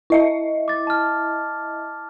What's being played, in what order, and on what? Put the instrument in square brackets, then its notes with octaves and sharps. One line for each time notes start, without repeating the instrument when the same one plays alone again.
[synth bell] E4 D#5 E5
[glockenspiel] D6 A6
A5 F6